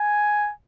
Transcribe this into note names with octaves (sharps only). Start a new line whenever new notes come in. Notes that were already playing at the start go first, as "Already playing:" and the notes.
Already playing: G#5